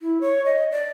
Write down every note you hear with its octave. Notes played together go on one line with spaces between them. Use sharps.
E4
C#5
D#5
D5